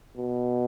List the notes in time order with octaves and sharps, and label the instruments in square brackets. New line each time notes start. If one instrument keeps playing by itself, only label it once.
[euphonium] B2